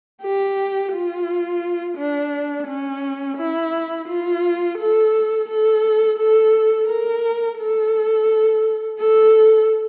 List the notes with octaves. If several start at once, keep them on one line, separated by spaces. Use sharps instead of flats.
G4
F4
D4
C#4
E4
F4
A4
A4
A4
A#4
A4
A4